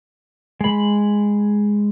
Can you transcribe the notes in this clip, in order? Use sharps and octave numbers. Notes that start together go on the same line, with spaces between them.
G#3 B5